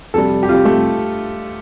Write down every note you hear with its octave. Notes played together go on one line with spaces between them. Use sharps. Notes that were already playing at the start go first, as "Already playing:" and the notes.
F2 C3 G3 A4
G4
F2 C3 G3 F4
A3